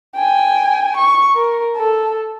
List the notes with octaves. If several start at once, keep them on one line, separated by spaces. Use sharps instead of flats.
G5 G#5
C#6
A#4
A4